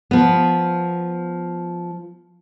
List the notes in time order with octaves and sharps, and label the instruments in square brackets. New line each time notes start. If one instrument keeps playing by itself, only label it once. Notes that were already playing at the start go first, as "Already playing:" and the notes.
[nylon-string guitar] F3 B3